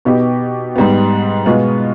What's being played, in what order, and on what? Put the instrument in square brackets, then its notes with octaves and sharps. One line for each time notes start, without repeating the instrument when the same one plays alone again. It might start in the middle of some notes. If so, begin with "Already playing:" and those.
[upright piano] B2 B3 D#4 G4
G#2 G3 B3
B2 G#3 B3 F4